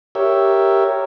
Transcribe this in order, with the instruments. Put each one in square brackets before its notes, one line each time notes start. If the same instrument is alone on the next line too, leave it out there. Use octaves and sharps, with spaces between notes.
[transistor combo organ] G4 A#4 C#5 E5